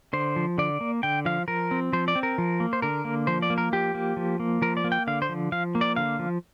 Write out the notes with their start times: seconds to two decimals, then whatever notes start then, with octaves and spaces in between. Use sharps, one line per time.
0.13 D3 C5
0.36 F3
0.58 D3 D5
0.81 A#3
1.03 D3 G5
1.25 F3 F5
1.48 F3 A#4
1.71 C4
1.93 F3 C5
2.08 D5
2.15 C4
2.23 A#4
2.38 F3
2.60 A#3
2.73 C5
2.82 D3 A#4
3.05 A#3
3.27 F3 C5
3.42 D5
3.50 A#3
3.58 A#4
3.73 F3 G4
3.94 A#3
4.17 F3
4.40 A#3
4.62 F3 A#4
4.77 D5
4.84 A#3
4.92 G5
5.07 D3 F5
5.22 C5
5.29 F3
5.52 F3 F5
5.75 A#3
5.81 D5
5.96 D3 F5
6.19 F3